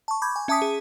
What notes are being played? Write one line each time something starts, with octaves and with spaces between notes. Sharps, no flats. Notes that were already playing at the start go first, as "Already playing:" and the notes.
A5 C#6
B5 C#6 D6 G6 G#6
G#5
C#4 E5 A5 D6 D#6 B6
G#4